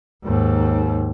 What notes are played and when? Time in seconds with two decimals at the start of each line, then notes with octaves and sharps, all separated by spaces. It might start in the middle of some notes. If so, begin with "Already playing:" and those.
0.24 D#2 G#2